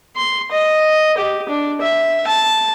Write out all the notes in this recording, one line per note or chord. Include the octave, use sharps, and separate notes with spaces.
C6
D#5
G4
D4
E5
A5